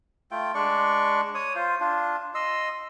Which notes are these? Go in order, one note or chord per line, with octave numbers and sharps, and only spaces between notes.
A3 F4 G5
G#3 D4 D5 C#6
C#5 D#6
F4 C5
D4 F4
D#5 C6 E6